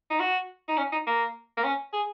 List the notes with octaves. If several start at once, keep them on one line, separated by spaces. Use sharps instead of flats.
D#4
F#4
D#4
C#4
D#4
A#3
A#3
C#4
G#4